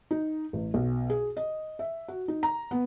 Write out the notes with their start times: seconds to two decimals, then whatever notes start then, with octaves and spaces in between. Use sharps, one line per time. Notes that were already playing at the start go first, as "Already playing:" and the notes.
0.11 D#4
0.53 A1
0.74 B1
1.10 G#4
1.37 D#5
1.79 E5
2.08 F#4
2.28 D#4
2.43 A#5
2.71 B3